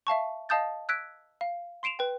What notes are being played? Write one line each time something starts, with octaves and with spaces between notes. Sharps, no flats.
E5 F5 A5 C#6
D#5 F5 A5 D#6 G6 A6
E6 F#6 G#6 B6 D7
F5
C6 C7 D7 E7 F7
B4 G5